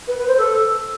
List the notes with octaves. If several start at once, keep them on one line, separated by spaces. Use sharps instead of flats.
B4
B4
C5
A4